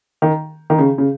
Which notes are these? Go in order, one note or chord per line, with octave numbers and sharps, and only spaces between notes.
D#3
D#3
C#3
C#3